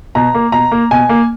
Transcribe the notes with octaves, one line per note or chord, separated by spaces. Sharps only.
B2 A#5
A#3
B2 A#5
A#3
B2 G#5
A#3